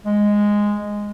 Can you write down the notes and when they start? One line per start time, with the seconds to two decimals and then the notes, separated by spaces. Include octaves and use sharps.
0.06 G#3